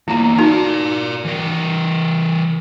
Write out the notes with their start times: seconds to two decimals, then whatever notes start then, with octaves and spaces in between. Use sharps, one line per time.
0.08 E2 A#3 E4 A#5
0.39 D#4 F#4 A#4 D5
1.25 E3 A#4